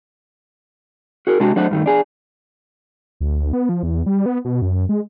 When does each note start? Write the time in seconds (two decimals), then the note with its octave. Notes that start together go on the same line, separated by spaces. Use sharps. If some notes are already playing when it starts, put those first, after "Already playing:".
1.27 F#4 G#4 A#4
1.40 C3 G#3 D4 F#4
1.56 F#3 A3 D4 C5 F#5
1.71 G2 D#3 A3
1.86 D4 G#4
3.21 D2
3.53 B3
3.69 F3
3.83 E2
4.06 G3
4.26 B3
4.45 B2
4.62 F#2
4.89 G#3